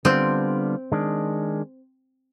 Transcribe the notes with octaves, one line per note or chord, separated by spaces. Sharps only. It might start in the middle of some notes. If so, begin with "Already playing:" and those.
D3 G3 B3 C4 D4 F4
D#3 G#3 D4